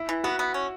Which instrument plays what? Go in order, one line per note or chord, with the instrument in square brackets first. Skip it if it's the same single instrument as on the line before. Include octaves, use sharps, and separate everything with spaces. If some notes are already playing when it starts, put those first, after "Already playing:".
Already playing: [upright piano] E4
[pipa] E3
[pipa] B3 [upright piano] F#4
[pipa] B3
C#4